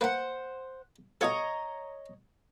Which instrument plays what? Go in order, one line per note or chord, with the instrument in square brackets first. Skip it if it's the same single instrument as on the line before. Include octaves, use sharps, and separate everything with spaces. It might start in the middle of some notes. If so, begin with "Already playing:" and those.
[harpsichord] A#3 B4 [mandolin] C5 F#5
[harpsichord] B2 F4 A4 [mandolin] C#5 D#5 A#5